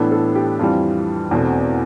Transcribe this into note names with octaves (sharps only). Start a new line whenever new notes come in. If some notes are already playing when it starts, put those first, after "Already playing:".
Already playing: A2 E3 B3 D4 A4
A4
G4
F2 E3 G3 F4
E2 B2 A3 C4